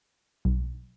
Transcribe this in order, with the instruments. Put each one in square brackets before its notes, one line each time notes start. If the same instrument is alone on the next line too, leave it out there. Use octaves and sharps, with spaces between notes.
[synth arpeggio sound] B1